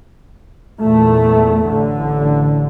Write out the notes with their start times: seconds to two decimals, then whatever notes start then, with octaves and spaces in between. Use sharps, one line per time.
0.80 E2 A#2 A3
1.68 A1 D3